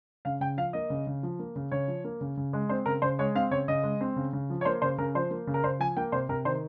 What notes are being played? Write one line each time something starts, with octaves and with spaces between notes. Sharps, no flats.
C#3 F5
C#3 G5
F3 F5
A#3 D#5
C#3
C#3
F3
A#3
C#3
C#3 C#5
F3
A#3
C#3
C#3
G#3
C4 C5
C#3 A#4
C#3 C5
G#3 C#5
C4 F5
C#3 C#5
C#3 D#5
G#3
C4
C#3
C#3
F3
C#5
A#3 C5
C#3 C5
C#3 A#4
F3 C5
A#3
C#3
A#4
C#3 C5
F3 G#5
A#3 G5
C3 C5
C3 A#4
D#3 C5